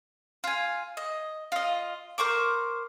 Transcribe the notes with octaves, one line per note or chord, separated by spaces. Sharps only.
F4 G#5
D#5
F4 D#5
A#4 C5 C#6 D6